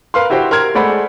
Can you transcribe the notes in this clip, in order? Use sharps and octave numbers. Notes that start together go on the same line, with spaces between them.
A#4 B4 F5 C6
E4 F#4 G4 C5 G5
A#4 C6 F6 G#6
G#3 A3 C5 D5 F#5 B5